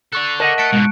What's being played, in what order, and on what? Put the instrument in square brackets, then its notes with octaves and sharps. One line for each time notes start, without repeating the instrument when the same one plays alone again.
[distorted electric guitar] A4 D5 [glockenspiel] C#6 F#6
[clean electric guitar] A#4 D#5 F#5 [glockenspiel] A5
[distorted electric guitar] E5 A5 [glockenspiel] F#6 C#7 D7
[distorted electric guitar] G#2 B2 [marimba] G#3